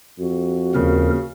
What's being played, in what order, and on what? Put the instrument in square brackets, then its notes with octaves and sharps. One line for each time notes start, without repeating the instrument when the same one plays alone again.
[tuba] F2 [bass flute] F#4
[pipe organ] D#2 A#4 [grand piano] C#3